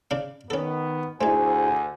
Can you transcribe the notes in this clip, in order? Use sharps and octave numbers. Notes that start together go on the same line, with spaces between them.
C#3 D4 F5
D#3 B3 C#4 A4
D2 A3 D#4 E4 G#4 C5 G#5